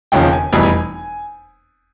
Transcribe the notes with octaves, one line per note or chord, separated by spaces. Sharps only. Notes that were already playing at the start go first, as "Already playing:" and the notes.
E1 D#2 C#3 F3 G5
G#5
F1 E2 B2 G3